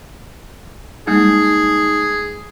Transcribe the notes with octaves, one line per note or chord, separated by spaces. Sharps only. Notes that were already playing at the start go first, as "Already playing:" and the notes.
G3 G#3 A#3 D#4 G#4